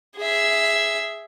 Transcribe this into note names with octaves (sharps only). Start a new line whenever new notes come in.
G#4 E5